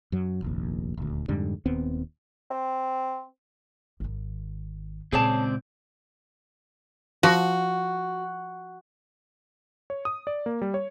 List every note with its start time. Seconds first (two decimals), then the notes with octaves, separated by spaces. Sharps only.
0.12 F#2 F#3
0.42 F1 A#1 D#2
0.97 D#1 D2
1.28 F2 G#2 D3 G3
1.66 D#1 D#2 B3 C4
2.51 C4
4.00 G#1 D#3
5.12 C#2 A#2 C4 G#4 C#5 D5 A5
7.23 F3 F#4
9.90 C#5
10.05 D#6
10.27 D5
10.46 A#3
10.62 G3
10.74 C#5